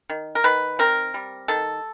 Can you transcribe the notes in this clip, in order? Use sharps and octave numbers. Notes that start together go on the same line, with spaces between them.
D#3
A#4
D#3 B4
C4 A#4
G3
D#3 A4